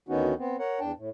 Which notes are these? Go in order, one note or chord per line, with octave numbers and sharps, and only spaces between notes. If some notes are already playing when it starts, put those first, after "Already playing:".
D2 D#3 B3 C#4 D#4 F#4
B3 C4
A#4 C#5 F#5
E2 D4 G5 A5
A2